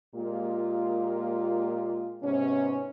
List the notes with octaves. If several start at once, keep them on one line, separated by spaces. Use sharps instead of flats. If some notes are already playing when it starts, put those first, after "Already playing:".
A#2 G#3 A#3 F4 G4
G#2 C3 B3 C#4